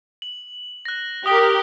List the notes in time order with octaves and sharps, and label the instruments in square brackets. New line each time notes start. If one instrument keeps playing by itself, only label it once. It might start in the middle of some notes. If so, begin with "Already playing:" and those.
[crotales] F#7
F#6 A#6
[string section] G4 A#4 [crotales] D#6 G7